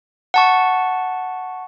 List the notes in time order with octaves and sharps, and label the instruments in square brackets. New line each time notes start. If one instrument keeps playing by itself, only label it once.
[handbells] F#5 A5 C#6